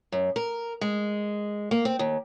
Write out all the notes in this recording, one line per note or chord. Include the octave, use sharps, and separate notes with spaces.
F#2
A#4
G#3
A#3
C4
D#2